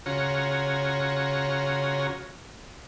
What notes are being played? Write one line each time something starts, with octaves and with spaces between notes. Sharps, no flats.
C#3 F4 F#4 C#5 A#5